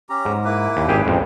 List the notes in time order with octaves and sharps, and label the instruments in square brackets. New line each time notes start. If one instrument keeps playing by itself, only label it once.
[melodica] C#4 G4 A#5
[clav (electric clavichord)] G#2
[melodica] A#3 E4 B4
[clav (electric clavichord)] D#2
G#1 G4 G#4
[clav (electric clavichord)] A1 F2 G#3 [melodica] F#3